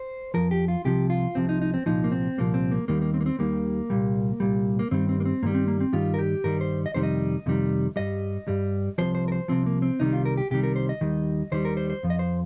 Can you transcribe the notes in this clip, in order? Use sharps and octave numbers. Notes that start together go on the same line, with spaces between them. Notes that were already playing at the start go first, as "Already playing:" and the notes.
Already playing: C5
F2 F3 A#4
G4
F4
C2 C3 F3 G4
F4
C2 C3 F3 C4
D#4
D#4
C4
C2 A#2 F3 D#4
A#3
C4
C2 A#2 F3 A#3
C4
A#3
D#2 D#3 G3 A#3
A#3
C4
A#3
C4
D#2 D#3 G3 A#3
C2 A#2 G3
C2 A#2 G3
A#3
G2 D#3 G3 C4
C4
A#3
C4
G2 D#3 G3 A#3
C4
A#3
C4
G2 D#3 G3 F4
A#4
G4
G2 D#3 G3 A#4
C5
D#5
F2 C3 D#3 G3 C5
D#5
F2 C3 D#3 G3
G2 G3 D#5
G2 G3
C2 C3 F3 C5
C5
A#4
C5
C2 C3 F3 C4
A#3
C4
C2 C3 D#3 G3 D#4
F4
A#4
G4
C2 C3 D#3 G3 G4
A#4
C5
D#5
D#2 D#3 G3
D#2 D#3 G3 C5
A#4
C5
C5
F2 F3
D#5
C5